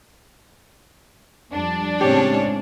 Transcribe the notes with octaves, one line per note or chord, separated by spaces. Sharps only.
F2 G3 D4
A2 C#3 G#3 C4 C#4 G4 C#5